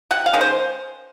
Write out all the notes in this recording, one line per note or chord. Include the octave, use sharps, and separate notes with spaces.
C3 F#5
F5
D#3 G#3 C#4
C5